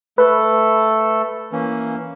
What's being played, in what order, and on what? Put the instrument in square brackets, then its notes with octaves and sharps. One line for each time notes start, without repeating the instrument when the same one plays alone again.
[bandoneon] A3 A4 [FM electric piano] B4
[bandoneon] E3 A#3 C#4